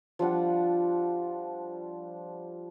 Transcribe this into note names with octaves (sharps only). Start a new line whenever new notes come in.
F3 G3 D4 F#5